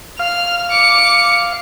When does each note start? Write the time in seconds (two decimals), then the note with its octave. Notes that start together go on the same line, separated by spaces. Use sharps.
0.19 F5 F6
0.71 D6 C#7